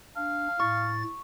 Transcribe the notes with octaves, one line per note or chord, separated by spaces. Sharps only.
D4 F5
A2 C#6 A6